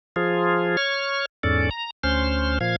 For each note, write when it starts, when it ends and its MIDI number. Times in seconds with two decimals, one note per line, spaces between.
0.16 0.77 53
0.16 0.77 65
0.16 0.77 68
0.77 1.25 73
0.77 1.25 85
0.77 1.25 89
1.43 1.70 40
1.43 1.70 44
1.43 1.70 61
1.43 1.70 69
1.43 1.70 74
1.71 1.90 82
2.04 2.58 38
2.04 2.58 61
2.04 2.58 72
2.04 2.58 84
2.04 2.58 89
2.61 2.76 46
2.61 2.76 53
2.61 2.76 77
2.61 2.76 92